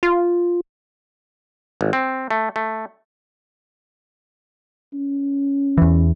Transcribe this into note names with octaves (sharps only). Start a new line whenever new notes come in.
F4
G#1
C4
A3
A3
C#4
E2 E3